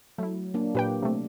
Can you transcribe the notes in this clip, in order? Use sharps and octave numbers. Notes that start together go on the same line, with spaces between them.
F#3 A3 E4
A#3 D4
A#2 G4 B4 G5
C3 A3